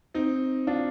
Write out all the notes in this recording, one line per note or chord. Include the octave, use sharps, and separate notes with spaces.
C4 D#4
D4 F4